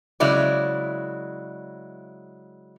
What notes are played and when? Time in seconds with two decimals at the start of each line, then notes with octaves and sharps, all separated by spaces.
0.20 C#3 F#3 G#3 E4 D5